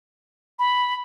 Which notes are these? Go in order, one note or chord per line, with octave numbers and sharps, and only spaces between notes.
B5